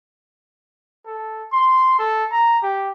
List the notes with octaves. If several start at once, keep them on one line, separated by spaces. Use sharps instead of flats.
A4
C6
A4
A#5
G4